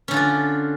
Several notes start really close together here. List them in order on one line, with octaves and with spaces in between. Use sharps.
C#4 D3 F4 D4